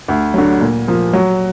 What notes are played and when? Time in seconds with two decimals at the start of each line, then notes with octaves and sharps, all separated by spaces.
0.08 D2
0.34 D3 F#3
0.61 A#2
0.87 F3 A#3
1.13 F#3